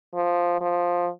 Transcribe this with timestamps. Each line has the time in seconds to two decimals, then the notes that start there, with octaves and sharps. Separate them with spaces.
0.15 F3
0.61 F3